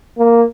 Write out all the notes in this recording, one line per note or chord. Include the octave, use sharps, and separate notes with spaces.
A#3